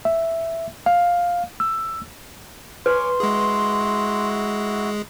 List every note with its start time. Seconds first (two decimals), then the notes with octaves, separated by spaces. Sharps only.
0.05 E5
0.86 F5
1.60 E6
2.86 B4 C#5 G#5 C6 D6
3.20 G#3 E4 F#4 G#4